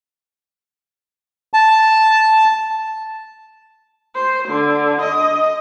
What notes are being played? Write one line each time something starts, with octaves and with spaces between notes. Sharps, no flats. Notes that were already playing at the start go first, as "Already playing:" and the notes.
A5
C5
D3
D#5